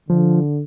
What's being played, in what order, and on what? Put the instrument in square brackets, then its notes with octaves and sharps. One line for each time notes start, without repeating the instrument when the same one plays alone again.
[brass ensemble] D3 [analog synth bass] F3